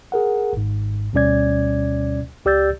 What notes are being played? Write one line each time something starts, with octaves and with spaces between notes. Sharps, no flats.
G#4 A#4 F#5
G#1 G#2
D2 B2 G3 C#4 D5 G#6
C#2 G4 D5 E6 G6 A6